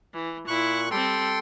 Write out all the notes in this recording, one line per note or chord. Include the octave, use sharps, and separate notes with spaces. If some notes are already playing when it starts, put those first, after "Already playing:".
E3
A#2 E4 C#6 F#6
G3 C4 A4 G5 C6